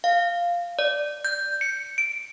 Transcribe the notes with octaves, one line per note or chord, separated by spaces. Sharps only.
F5
D5
G6
C#7
D7